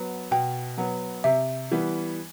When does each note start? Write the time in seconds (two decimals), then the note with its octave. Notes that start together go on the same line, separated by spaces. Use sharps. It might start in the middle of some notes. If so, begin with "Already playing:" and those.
Already playing: F#3 B3
0.31 B2 G5
0.78 F#3 B3
1.24 C3 E5
1.72 E3 G3 B3